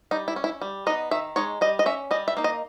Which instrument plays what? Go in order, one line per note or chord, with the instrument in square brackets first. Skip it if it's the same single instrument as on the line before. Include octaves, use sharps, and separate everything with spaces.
[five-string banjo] G3 D#4
E4
C#4
E4
G3
D#4 D#5
B3
D#3 E5
G#3 D#4 C#5
G3 D#5
D#5
C#4 E5
G3 D#5
E5
A#3 D#4
D#5